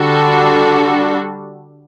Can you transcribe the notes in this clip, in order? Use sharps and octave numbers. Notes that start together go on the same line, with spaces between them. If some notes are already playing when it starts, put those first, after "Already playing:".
Already playing: D3 G3 D4 F#4 A4